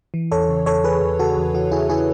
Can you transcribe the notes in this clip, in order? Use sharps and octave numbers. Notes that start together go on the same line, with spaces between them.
E3
E2 A4 C#5
C#3
E2 A4 C#5
E3 G#4 B4
E2
C#3 F#4 A4
E2
E3 F#4
E2 E4 G#4
C#3 E4 G#4